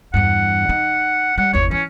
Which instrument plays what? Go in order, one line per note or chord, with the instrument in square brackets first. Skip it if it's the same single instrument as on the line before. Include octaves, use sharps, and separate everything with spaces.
[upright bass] E2 G2 [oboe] F#5
[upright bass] D#4
[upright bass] G3 [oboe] F#5
[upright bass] G1 E2 [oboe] C#5
[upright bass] E3 [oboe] C#4